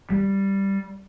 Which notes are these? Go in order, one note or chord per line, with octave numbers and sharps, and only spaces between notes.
G3